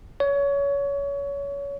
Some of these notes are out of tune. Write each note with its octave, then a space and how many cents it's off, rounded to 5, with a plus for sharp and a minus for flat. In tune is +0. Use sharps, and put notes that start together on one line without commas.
C#5 +25